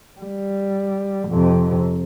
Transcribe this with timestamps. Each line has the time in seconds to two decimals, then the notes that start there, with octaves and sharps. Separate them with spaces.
0.20 G3
1.29 F2 C3